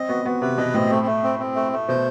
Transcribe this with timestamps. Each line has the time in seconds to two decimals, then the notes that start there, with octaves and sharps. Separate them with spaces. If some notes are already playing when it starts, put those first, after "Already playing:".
Already playing: C4 D#5
0.09 B3 F#4
0.25 B3 F#4
0.42 C3 B4
0.58 B2 D#5
0.74 A2 C4
0.90 A3
1.07 A3
1.23 C4
1.39 C4
1.56 A3
1.72 A3
1.89 B2 C5